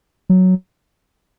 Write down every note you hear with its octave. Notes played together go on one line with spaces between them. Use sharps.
F#3